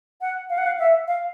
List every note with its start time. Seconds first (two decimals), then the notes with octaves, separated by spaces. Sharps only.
0.21 F#5
0.50 F5
0.58 F#5
0.67 F5
0.79 E5
1.08 F5